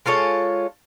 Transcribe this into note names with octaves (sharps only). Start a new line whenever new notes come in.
G#3 F4 A4 C#5